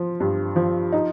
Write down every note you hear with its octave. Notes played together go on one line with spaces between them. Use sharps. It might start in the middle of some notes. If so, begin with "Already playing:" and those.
Already playing: F3 F4
G2
F3
D#4